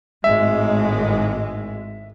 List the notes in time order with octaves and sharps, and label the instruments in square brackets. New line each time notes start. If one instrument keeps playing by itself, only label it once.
[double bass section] G#1 A2 G#3 [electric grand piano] E5